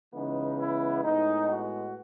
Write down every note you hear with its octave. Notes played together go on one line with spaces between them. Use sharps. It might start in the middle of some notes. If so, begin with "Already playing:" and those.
C#3 E3 G#3 B3 D#4
E4
A2 G#3 B3 D#4
F#4